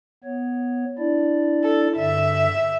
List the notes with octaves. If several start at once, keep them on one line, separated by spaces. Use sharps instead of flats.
B3 C#5
D4 E4 D5
A4
G2 D3 E5